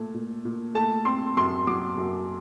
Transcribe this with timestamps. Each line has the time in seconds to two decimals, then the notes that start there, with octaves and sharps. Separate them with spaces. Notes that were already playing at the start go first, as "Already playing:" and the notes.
Already playing: A#2 A3
0.14 A#2
0.45 A#2
0.75 A3 A5
1.05 C4 C6
1.37 F#2 C6
1.67 F#3 D6
1.98 F#2